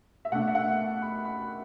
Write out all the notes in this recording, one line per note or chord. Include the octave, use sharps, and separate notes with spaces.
E5
B2 A3 D4 F#5
E5
F#5
B5
B5